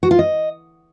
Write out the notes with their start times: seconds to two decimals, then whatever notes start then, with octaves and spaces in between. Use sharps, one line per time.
0.03 F#4
0.11 F4
0.19 D#5